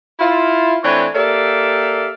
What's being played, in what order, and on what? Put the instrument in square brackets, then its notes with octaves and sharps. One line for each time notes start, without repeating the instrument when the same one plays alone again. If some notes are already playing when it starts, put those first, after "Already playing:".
[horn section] E4 F4
E3 A3 C4 D4 B4 C#5
A#3 G4 A4 D5 E5 F5